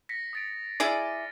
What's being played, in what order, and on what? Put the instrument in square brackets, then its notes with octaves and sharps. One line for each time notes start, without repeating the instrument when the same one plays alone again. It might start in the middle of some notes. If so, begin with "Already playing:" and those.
[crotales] A#6 B6 C#7
D#6 A6 D7
[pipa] E4 G#4 D5 [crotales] F6 A6 D#7